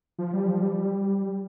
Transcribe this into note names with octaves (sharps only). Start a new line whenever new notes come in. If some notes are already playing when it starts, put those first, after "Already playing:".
F3
G3
F3
G3